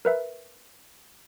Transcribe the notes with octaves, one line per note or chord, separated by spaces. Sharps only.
A#4 B4 E5